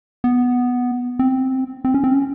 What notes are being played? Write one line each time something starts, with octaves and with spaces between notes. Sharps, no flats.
B3
C4
C4
C#4
C4
C#4